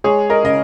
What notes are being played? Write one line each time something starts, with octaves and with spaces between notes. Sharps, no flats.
G#3 G#4 C#5
A#4 D#5
C#3 D#5